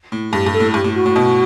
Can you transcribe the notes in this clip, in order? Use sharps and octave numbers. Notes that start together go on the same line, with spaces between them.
A2
G2 G4
G2
A4
A2
G2 G4
A2
F#4
A2
B2